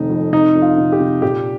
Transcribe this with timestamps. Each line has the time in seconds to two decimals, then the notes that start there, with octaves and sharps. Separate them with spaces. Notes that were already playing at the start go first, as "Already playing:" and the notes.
Already playing: F1 C3 D#3 D#4
0.10 F2
0.33 C3 D#4
0.55 F2
0.62 F4
0.78 C3
0.92 G4
1.00 C3
1.22 A#2 G4